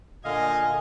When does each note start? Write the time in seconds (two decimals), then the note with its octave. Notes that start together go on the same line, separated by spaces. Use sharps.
0.25 A#2 D3 D#5 F5 G#5